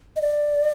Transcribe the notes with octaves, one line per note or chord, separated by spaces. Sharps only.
D#5
D5